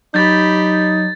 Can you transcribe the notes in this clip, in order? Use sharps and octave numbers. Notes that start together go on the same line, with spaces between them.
F#3 D#4 G4 B5 G6 A6